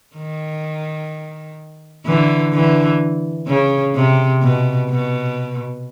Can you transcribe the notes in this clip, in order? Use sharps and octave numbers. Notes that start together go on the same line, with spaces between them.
D#3
D3 E3
D3 E3
C#3
C3
B2
B2